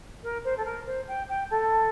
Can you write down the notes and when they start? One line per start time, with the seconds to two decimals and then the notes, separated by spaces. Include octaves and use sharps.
0.23 A#4
0.44 C5
0.57 A4
0.65 A#4
0.86 C5
1.07 G5
1.28 G5
1.50 A4